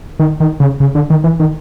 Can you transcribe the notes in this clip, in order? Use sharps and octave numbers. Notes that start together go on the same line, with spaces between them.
D#3
D#3
C#3
C#3
D3
D#3
E3
D#3